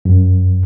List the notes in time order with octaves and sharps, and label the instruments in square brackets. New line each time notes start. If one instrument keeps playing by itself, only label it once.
[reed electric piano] F#2